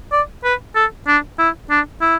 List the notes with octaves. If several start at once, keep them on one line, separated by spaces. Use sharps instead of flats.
D5
B4
A4
D4
E4
D4
E4